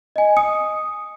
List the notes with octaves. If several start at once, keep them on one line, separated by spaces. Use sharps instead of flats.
D#5 G#5
D#6 C#7